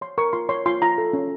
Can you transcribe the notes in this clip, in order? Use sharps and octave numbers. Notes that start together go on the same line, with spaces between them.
C#5 C6
A#4 C#6
F4 C6
C#5 C6
F4 C6
F4 A#5
A4
C#4